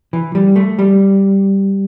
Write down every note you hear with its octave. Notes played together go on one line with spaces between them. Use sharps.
E3
G3
A3
G3